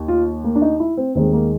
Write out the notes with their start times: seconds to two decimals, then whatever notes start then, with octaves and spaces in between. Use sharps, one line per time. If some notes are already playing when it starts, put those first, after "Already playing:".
Already playing: D#2
0.08 F4
0.44 A#3
0.55 D4
0.62 D#4
0.80 E4
0.97 C4
1.15 D#2 D#3 G#3 C4
1.33 A#3